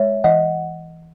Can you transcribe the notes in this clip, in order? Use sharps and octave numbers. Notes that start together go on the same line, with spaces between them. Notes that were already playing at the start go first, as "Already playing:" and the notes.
Already playing: G#3 C#5 E5
E3 D#5 F#5